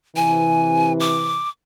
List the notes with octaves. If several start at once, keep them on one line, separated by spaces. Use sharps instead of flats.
C3 E3 G#5
D6